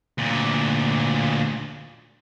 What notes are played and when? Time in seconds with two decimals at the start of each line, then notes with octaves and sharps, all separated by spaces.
0.18 D2 A#2